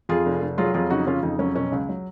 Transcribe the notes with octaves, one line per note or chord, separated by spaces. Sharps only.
F2 F4 G#4
F1
F1
F#3 F4 G#4
F2 F4 G#4
C#3 D#4 F#4
C#3 C#4 F4
F2 D#4
F#3 C#4
B2 C#4
C#2
F#3